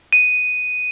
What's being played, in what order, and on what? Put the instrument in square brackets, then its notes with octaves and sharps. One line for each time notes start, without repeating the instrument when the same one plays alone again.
[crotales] D#7